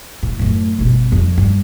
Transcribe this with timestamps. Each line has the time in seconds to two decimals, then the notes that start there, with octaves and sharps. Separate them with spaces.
0.23 A2
0.39 F#2 A2
0.79 G1 B2
1.12 F2 D4
1.38 G2